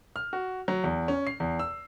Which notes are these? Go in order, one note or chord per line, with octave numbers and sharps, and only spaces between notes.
F6
F#4
F#3
E2
C#4
C7
E2
E6